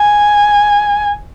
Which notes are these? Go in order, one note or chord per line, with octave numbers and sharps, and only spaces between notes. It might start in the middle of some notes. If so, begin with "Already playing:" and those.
Already playing: G#5